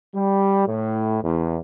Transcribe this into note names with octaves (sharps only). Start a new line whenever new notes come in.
G3
A2
E2